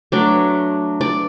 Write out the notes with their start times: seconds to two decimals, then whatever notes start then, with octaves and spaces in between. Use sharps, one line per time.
0.12 F#3 A3 D4 D5
1.01 D5